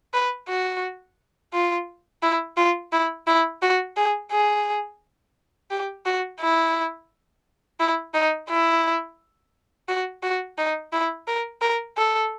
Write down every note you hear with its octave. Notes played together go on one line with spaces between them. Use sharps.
B4
F#4
F4
E4
F4
E4
E4
F#4
G#4
G#4
G4
F#4
E4
E4
D#4
E4
F#4
F#4
D#4
E4
A#4
A#4
A4